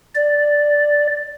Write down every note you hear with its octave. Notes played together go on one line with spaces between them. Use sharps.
D5